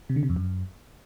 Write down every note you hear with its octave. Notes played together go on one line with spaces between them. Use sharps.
C3
D3
C3
F2
F#2